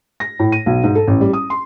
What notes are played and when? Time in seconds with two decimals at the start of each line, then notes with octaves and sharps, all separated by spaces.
0.20 A#6
0.39 A2
0.52 D#7
0.66 B1
0.84 G#2
0.95 A4
1.07 A1
1.21 G3
1.33 D#6
1.50 C6